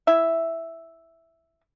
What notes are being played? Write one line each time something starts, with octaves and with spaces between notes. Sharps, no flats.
E4 E5